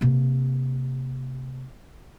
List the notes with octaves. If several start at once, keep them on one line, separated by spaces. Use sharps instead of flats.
C3 A#3